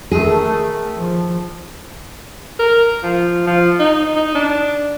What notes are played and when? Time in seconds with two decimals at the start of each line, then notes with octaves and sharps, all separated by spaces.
0.11 D#3 A3 G#4
0.97 F3
2.59 A#4
3.03 F3
3.47 F3
3.80 D#4
4.16 D#4
4.35 D4